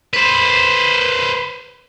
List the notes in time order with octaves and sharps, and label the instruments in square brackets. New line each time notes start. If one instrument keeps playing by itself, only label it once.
[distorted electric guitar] B4 C5